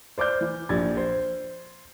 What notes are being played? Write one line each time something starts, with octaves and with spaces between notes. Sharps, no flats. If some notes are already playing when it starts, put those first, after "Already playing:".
C5 D5 D6 F6 G6
E3
A#1 G4 G#6 A6
C5